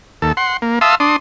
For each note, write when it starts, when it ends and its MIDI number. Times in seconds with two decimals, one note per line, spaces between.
0.22 0.32 39
0.22 0.32 69
0.37 0.57 78
0.37 0.57 84
0.62 0.79 58
0.81 0.95 76
0.81 0.95 77
0.81 0.95 81
0.81 0.95 84
0.81 0.95 87
0.81 0.95 88
1.00 1.16 62
1.00 1.16 84
1.00 1.16 87